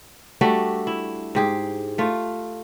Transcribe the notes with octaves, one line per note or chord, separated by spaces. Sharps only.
G3 A3 D4 F#4
E4
G#2 G4 G#4
A3 F4